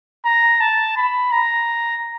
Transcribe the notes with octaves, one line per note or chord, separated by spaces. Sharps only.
A#5
A5
B5
A#5